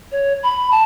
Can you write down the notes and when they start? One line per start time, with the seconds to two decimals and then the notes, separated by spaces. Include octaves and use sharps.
0.12 C#5
0.43 B5
0.71 A5